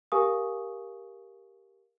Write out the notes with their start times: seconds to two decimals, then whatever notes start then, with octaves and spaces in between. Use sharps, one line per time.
0.12 G4 A#4 F5 G#5 C#6 D#6